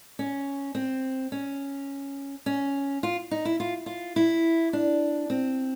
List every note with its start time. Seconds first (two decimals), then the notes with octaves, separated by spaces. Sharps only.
0.19 C#4
0.75 C4
1.32 C#4
2.46 C#4
3.03 F4
3.31 D#4
3.45 E4
3.60 F4
3.86 F4
4.16 E4
4.73 D4
5.30 C4